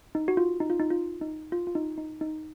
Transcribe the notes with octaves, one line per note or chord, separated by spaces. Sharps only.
D#4
F#4
F4
D#4
F4
D#4
F4
D#4
F4
F4
D#4
D#4
D#4